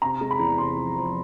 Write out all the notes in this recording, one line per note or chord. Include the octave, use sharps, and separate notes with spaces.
C3 A#5
G#3
B5
E2
C3 C6
F3
F3